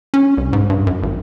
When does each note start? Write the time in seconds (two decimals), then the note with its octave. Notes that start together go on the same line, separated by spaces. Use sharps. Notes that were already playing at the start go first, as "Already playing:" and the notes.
0.14 C#4
0.37 C2
0.53 G#2
0.70 G2
0.87 F#2
1.03 G#1